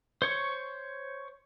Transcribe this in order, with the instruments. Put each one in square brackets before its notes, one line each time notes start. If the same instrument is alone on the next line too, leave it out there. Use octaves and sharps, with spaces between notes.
[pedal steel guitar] C5 C#5 C#6